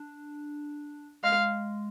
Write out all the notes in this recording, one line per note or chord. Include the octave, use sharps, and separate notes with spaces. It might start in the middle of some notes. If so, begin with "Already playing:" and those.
Already playing: D4
G#3 F5